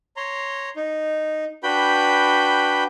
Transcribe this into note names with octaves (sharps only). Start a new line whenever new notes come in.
C#5 A#5 C6
D#4
D4 F#4 B4 G5 B5 G6